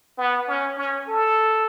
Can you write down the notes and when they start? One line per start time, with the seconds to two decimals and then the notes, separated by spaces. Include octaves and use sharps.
0.18 B3
0.48 C#4
0.77 C#4
1.08 A4